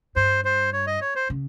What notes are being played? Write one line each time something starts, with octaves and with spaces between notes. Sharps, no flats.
G2 C5
C5
C#5
D#5
C#5
C5
C#3